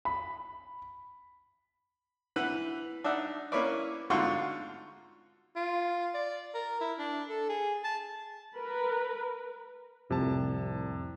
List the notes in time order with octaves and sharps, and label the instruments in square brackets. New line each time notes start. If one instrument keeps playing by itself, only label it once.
[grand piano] B5
[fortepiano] E3 B4 F#5 B5
D4 D#4 E5 F#5
A#3 C#4 E4 B4 C#5 D5
G#2 D3 F4 F#4 C6 C#6
[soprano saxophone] F4
D5
A#4
E4
D4
A4
G#4
A5
[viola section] A#4 B4
[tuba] C2 [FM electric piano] F2 A2 [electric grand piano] C3 A5